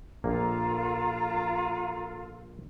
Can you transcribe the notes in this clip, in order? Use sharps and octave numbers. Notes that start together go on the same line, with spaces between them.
A#1 A#3 F4 A4 A#5